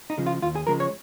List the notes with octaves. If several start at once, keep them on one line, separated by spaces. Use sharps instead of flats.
D#4
C#3 F3 G#3
F4
D#2 F4
G#4
C#3 F3 G#3 A#4
C#5